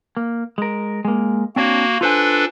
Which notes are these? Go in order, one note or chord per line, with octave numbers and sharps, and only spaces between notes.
A#3
G#3 A#4
G#3 A#3
A#3 C4 D4 F#4 C#5
D4 F4 A4 B4 C5 G#5